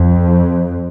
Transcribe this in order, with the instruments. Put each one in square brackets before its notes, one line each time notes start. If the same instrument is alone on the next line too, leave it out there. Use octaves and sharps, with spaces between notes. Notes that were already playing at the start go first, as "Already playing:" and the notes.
Already playing: [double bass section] F2